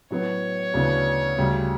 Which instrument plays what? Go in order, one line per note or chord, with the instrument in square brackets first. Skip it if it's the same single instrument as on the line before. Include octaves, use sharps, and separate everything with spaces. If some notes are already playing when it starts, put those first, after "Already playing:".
[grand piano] A2 F#3 B3 F#4 [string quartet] C#5
[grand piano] D2 C#3 E3 B3 D4
D2 C#3 G3